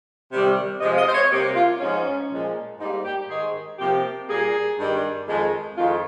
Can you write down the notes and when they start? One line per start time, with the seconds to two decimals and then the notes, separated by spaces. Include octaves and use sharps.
0.32 C3 D#3 G3
0.81 C3 F3 G#3 D#5
0.93 F5
0.98 D#5
1.09 C5
1.14 C#5
1.31 C3 G3 A#3 G4
1.56 F4
1.80 G#2 F3 G#3 C#4
2.30 A#2 F3 G#3
2.79 G#2 G3 A#3 D#4
3.05 G4
3.28 G#2 D#3 G#3 G#4
3.78 C3 F3 A#3 G4
4.28 A#2 G3 A#3 G#4
4.78 G2 D#3 G3
5.27 F2 D#3 G#3
5.76 F2 D#3 G#3 F4